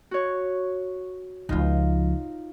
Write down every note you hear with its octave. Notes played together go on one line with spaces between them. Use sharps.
F#4 C#5
C#2 F3 D#4 F4